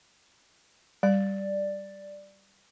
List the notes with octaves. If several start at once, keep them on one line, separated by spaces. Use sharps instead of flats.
G3 D5